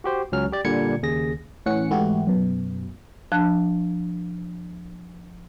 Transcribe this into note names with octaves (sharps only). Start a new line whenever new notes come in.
F#4 G4 C5
C#2 F#3 C#4 F6
G4 D5
A#2 D3 G3 G#6 C#7
D#2 C#3 G#4 A#6
A2 E3 C#4 F#5 C#7
G#2 E3 A3 E4 F#4 G4
F#2 B2
F3 D4 A5 F#6